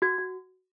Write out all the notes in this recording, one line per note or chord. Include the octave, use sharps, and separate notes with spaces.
F#4 G#6
F#4